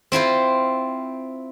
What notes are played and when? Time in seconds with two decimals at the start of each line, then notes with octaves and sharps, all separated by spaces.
0.12 C4 E4 F4 C5